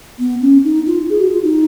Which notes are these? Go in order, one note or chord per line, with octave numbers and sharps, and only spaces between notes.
B3
C#4
D#4
F4
G#4
F#4
F4
D#4